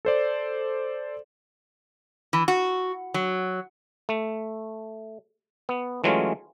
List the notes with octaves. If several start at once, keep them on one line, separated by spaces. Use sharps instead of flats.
A4 C5 D5
E3
F#4
F#3
A3
B3
E3 F#3 G#3 A3 C#4 F4